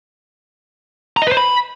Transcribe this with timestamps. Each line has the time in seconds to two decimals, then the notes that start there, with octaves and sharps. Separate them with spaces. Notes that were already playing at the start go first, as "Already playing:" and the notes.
1.17 A#5
1.22 D#5
1.27 B4
1.32 C5
1.37 B5